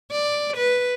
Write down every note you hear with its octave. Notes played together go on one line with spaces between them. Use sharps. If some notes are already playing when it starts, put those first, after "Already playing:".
D5
B4